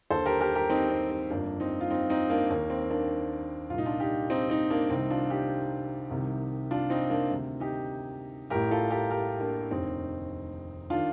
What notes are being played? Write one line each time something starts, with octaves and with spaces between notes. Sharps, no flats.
D#2 D3 A4 C5
G4 A#4
G4 A#4
G4 A#4
C4 D#4
C4
C4
G1 F2 D3 A#3 D4
C4 D#4
F4
C4 D#4
C4 D#4
A#3 D4
D#2 D#3 A#3
C4
A#3 D4
C2 A#2 D#4 F4
D4 F4
D#4 G4
C4 D#4
C4 D#4
A#3 D4
C2 C3 D#3 C4 D#4
D4 F4
D#4 G4
C2 C3 D#3
D4 F4
C4 D#4
A#3 D4
D2 C3 D#3
D#4 G4
A1 A2 G4 A#4
F4 A4
G4 A#4
G4 A#4
A#3 D4
F1 D#2 D3 C4 D#4
D#3 D4 F4